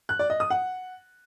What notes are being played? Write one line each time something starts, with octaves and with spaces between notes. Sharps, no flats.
F#6
D5
D#5
D#6
F#5